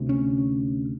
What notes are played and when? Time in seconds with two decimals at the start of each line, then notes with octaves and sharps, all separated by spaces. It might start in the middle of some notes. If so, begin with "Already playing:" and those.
Already playing: D2 C3
0.09 C#4